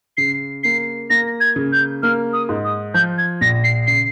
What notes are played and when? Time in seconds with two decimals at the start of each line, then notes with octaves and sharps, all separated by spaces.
0.17 C#3 C7
0.63 A#3 C7
1.10 A#3 A#6
1.41 G#6
1.56 C#3
1.72 G6
2.03 A#3 F6
2.33 D#6
2.49 G#2
2.65 D#6
2.94 F3 G6
3.18 G#6
3.41 A#1 A#6
3.64 C7
3.87 C#3 C7